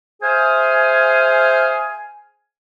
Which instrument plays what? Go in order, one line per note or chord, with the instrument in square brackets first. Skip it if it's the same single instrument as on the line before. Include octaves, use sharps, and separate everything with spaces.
[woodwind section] G#4 C5 E5 F5 G#5